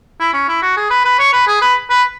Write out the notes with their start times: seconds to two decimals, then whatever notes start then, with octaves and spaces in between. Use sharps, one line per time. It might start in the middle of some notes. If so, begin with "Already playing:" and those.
0.20 E4
0.33 C#4
0.48 E4
0.62 F#4
0.77 G#4
0.90 B4
1.05 B4
1.19 C#5
1.33 B4
1.47 G#4
1.61 B4
1.90 B4